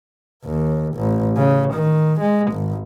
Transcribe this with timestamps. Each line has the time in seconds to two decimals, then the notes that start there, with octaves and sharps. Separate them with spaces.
0.45 D#2
0.96 A1
1.37 C#3
1.73 D#3
2.20 G#3
2.52 G#1